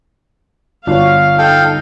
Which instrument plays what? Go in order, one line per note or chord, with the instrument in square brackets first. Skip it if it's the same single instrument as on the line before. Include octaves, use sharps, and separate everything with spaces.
[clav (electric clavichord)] G1 D4 [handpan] F4 F#4 C#5 [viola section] F5
[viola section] D#4 [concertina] A4 F5 G5